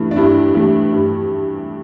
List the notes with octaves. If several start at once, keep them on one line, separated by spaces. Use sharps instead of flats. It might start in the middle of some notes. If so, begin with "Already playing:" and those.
Already playing: G2 E3 A3
D4
G2 E4
E3 A3 E4
G2